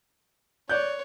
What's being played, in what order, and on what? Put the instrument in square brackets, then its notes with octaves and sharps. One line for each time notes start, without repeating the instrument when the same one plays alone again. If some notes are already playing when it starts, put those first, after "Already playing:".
[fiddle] C#5 [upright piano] D5 F#6 G6